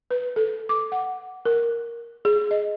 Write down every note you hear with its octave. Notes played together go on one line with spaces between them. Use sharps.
B4
A4
D6
F#5
A#4
G#4
D#5